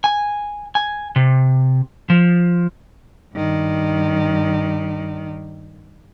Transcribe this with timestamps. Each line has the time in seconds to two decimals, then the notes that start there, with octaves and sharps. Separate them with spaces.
0.04 G#5
0.75 G#5
1.16 C3
2.10 F3
3.34 G2 D#3